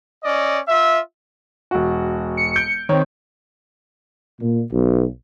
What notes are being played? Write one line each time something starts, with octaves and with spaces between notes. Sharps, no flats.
C#4 D5 D#5
F4 E5
E1 F#4
C#7
G6 D7
D#3 C4 C#5
A#2
B1